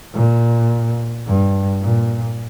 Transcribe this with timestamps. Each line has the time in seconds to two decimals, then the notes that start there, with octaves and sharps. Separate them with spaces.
0.14 A#2
1.27 G2
1.82 A#2